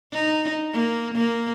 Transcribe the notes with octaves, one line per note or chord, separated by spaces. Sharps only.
D#4
A#3
A#3